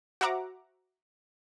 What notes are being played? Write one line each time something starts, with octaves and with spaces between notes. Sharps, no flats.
F#4 C5 E5 F#5 A#5 D6